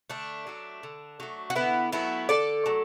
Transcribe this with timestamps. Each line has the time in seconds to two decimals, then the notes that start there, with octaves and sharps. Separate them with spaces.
0.10 D3 A3 D4
0.47 F#3 A3
0.83 D3
1.20 F#3 A3
1.50 F#4
1.55 D3 B3 E4
1.92 F#3 A3 B3 E4
2.29 D3 A4 D5
2.66 F#3 A3